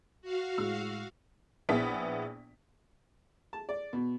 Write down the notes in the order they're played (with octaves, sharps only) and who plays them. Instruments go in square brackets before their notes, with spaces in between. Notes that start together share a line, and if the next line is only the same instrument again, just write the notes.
[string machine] F#4 F5
[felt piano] A2 G#3 E6
[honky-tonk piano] A#1 B3 E4 G#4 B6
[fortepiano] A5
D5
B2